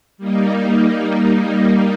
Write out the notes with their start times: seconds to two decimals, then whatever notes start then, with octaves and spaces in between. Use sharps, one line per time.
0.18 G3 A#3 D#4